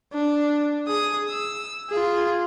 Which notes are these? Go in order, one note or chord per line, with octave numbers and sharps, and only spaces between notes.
D4
G#4 D#6
E6
F4 G#4